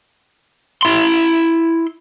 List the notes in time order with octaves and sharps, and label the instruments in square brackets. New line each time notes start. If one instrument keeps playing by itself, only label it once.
[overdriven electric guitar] E4 C6